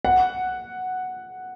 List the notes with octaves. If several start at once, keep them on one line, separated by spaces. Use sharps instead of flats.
F#5